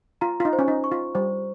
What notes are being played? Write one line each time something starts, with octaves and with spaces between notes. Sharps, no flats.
F4 A#5
F4
D#4
C5
C#4
D#4
C#6
F4
G3 C5